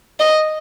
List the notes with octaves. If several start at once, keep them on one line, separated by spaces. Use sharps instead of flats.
D#5